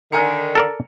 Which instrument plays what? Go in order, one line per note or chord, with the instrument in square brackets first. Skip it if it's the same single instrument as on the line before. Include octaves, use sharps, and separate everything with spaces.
[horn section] D3 D#3 [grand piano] G#5 A#5 C#7
[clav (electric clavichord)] A4 A#4 D5